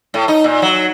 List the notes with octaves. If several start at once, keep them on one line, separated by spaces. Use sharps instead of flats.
A2
D#4
A#2
F#3